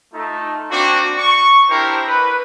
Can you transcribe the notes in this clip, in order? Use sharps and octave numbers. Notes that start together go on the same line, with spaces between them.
A3 D#4 F4
A#3 C4 D4 F#4
C#6
C4 D4 E4 G4 A#4 C5
B4